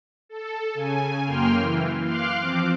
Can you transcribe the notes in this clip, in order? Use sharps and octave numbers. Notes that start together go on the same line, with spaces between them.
A4
C#3 G#5
F#2 A#3 G5 C6 F6
E3
F5 C6 D6 F6 F#6
F3 C4 D6